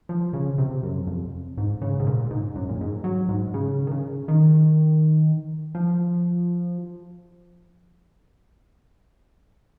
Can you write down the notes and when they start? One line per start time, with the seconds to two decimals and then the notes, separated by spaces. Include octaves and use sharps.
0.09 F3
0.33 C#3
0.58 C3
0.83 F#2
1.07 F2
1.57 G#2
1.82 C#3
2.00 G#2
2.07 A#2
2.31 G#2
2.56 F#2
2.69 A#2
2.81 G#2
3.04 F#3
3.29 G#2
3.54 C#3
3.87 D#3
3.91 C#3
4.28 D#3
5.75 F3